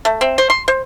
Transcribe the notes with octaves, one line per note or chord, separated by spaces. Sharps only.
A3
C4
C5
C6
C5